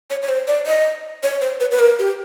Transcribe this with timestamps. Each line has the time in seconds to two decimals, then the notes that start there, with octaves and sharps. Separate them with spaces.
0.10 C#5
0.22 C#5
0.29 C5
0.47 D5
0.66 D#5
1.23 C#5
1.41 C5
1.60 B4
1.71 B4
1.79 A#4
1.99 G4